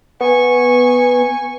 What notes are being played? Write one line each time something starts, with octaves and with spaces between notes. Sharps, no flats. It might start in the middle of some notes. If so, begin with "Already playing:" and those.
B3 G#5 C#6